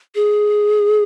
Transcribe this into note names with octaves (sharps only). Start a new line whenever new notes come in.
G#4